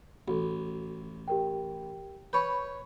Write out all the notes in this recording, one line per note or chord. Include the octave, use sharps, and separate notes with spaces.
A1 F#4 A4
G4 A#4 G5
B4 C#5 B5 C#6 G6